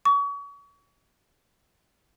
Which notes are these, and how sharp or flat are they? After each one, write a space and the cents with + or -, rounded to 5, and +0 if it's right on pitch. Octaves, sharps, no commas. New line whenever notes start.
C#6 +35